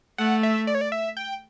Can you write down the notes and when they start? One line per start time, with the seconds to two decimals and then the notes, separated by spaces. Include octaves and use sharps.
0.18 A3 F#5
0.43 E5
0.67 D5
0.75 C#5
0.81 D5
0.92 E5
1.17 G5